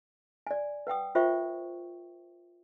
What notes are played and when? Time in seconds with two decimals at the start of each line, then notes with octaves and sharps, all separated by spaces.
0.47 D5 G#5
0.87 B4 F#5 G5 D#6
1.15 F4 A#4 C5 E5 G5 C#6